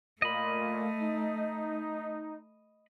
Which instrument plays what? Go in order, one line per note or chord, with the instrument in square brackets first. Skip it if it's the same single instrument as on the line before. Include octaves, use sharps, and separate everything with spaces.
[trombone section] A#2 [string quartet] A3 [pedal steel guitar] D#5 B5
[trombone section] D#4